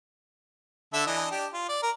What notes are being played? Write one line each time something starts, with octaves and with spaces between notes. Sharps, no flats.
D3 A4 E5
E3 D4 D#5
D4 G4
F4
D5
A#4